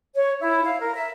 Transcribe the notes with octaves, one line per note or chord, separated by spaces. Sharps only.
C#5
E4
F5
A#4
E5